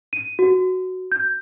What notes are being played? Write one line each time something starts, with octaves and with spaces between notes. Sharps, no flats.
D#7
F#4
G6